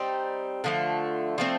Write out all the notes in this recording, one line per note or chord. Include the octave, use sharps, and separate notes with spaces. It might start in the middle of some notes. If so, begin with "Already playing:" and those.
Already playing: G3 C4 D#4
D3 F3 A3
F3 A3 C4